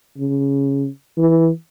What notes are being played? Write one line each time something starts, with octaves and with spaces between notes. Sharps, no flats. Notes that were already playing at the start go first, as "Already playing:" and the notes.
C#3
E3